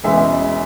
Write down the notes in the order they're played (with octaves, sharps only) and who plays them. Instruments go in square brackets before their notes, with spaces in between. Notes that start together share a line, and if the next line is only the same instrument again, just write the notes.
[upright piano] E1 E2 C#3 G#3 B3 E5